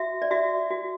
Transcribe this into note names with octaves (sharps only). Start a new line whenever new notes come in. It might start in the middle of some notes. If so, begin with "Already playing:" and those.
Already playing: F#4 E5
D5
F#4 E5
F#4